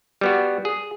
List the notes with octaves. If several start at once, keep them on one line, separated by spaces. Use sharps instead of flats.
G3 B3 F#4
G#4